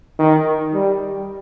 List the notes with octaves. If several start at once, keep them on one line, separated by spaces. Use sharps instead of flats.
D#3
G3